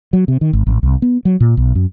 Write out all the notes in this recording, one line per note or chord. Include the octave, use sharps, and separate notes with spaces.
F#3
C3
D#3
G#1
A1
C2
B3
F#3
A#2
B1
F#2